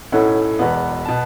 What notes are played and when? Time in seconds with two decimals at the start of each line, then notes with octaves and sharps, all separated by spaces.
0.12 B1 A2 A3 C#4 E4 F#5
0.59 E1 E2 B2 B3
1.05 B2 B3 A5